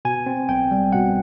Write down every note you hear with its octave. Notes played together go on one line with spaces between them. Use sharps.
B2 G#5
C4
B1 G5
G3
B2 F#5